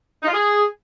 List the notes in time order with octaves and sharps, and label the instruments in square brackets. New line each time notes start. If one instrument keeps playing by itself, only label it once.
[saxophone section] D#4
F4
G#4